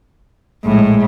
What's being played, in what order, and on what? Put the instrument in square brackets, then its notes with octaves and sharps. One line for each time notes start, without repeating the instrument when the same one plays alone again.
[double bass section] A#1 G#3 [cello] A2